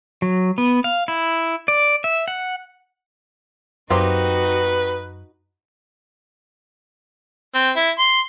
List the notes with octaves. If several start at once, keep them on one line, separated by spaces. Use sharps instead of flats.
F#3
B3
F5
E4
D5
E5
F#5
F#2 A#3 C4 D#4 F#4 G4 B4
C4
E4
C6